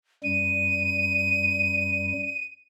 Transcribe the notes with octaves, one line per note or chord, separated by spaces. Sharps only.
F#2 G3 D#7